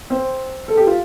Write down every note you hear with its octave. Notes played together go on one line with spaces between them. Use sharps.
C4
A4
G4
F4